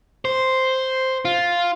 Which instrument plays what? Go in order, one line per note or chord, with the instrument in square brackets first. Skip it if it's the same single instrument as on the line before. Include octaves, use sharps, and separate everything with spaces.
[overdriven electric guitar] C5
F4